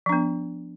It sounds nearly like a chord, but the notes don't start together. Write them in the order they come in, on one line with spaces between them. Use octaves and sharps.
F3 D4 B3